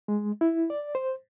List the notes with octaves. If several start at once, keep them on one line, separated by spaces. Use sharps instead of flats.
G#3
E4
D5
C5